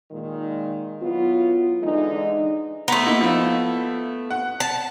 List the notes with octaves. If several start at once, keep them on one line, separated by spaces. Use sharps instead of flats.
A#2 D#3 G#3
F#3 B3 E4 F4
D3 E3 G#3 D#4
A3 B3 A#5 C6
A#3 D#4 E4
F3 E4 F4
F#5
A5